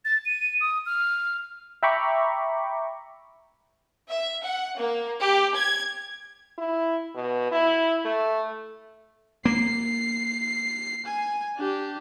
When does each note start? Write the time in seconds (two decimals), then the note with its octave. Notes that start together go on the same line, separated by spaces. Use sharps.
0.05 A6
0.25 D#7
0.61 D#6
0.86 F6
1.83 E5 G5 A#5 B5 C#6 D6
4.09 E5
4.44 F#5
4.78 A#3
5.21 G4
5.56 G#6
6.58 E4
7.15 B2
7.52 E4
8.05 A3
9.45 A#3 C7
11.06 G#5
11.57 D4 G4